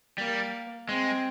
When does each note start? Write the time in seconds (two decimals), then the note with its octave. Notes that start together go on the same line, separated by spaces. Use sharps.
0.18 G3 A#3
0.89 G#3 C4